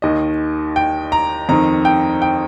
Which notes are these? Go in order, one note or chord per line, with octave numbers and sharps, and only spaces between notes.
D#2 D#3 D#5
G5
A#5
F2 D#3 A#5
G5
G5